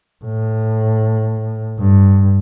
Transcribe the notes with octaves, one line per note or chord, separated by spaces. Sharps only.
A2
G2